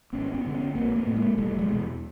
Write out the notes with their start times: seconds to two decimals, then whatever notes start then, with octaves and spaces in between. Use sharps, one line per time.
0.13 G#1 B3 C#4
0.34 B3 C#4
0.45 G2 D3
0.54 B3 C#4
0.75 A#1 A#3 C4
0.96 A3 B3
1.07 A2
1.17 G#3 A#3
1.37 E1 G3 A3
1.58 F#3 G#3
1.69 E2 B2